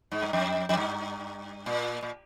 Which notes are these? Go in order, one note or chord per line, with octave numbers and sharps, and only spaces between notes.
G#2
G2
F2
F2
G2
A#2
A#2